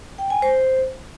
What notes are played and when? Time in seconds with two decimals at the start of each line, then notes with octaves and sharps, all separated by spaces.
0.18 G5
0.30 G#5
0.42 C5